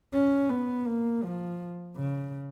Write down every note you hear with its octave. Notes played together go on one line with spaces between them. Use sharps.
C#4
B3
A#3
F3
C#3